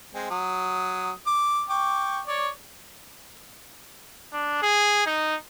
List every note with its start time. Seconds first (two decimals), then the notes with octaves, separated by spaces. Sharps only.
0.15 G#3 C4
0.31 F#3 D#6
1.27 D6
1.69 G5 C#6 D6
2.27 C#5 D5
4.33 D4
4.62 G#4
5.06 D#4